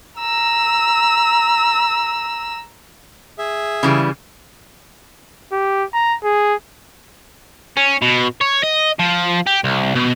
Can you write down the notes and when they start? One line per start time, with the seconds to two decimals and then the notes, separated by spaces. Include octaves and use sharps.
0.19 A#5 E6
3.38 G#4 E5
3.83 C#3 E3 G3
5.52 G4
5.94 A#5
6.24 G#4
7.77 C#4
8.02 B2
8.41 C#5
8.63 D#5
8.99 F3
9.47 G4
9.64 C2
9.95 B2